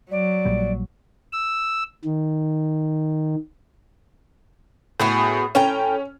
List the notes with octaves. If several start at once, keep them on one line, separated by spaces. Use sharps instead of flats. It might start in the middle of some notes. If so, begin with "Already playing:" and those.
F#3 D5
A#1 A#2 G3
E6
D#3
A2 B3 F#4 G#4
A2 C#4 G5 A#5